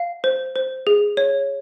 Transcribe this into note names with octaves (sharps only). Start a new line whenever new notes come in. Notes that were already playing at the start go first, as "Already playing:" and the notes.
Already playing: F5
C5
C5
G#4
C#5